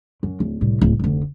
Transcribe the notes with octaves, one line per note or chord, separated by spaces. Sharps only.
F#2
D1
C2 A2
D1
F1 D2